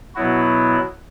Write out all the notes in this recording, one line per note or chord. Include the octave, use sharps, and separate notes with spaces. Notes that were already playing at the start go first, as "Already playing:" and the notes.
B2 F#3 B3 E4 F#4